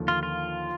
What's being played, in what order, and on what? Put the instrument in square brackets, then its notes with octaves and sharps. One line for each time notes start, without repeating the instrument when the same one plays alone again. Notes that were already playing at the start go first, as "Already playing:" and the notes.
Already playing: [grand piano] D#2 D3 F3 A#3
[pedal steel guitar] F4
F4